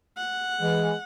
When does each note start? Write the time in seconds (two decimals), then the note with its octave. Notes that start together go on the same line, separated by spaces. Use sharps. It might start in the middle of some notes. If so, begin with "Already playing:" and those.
0.17 F#5
0.61 E3 G#3